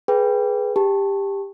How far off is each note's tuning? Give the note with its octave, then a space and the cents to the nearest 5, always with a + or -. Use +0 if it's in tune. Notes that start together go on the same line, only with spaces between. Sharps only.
G#4 +20 B4 +0 G5 +10
G4 +15 A5 +0